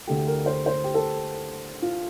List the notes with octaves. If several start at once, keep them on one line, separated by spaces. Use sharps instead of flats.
D2 D3 A3 G4
A#4
C5
C5
G4
A4
F4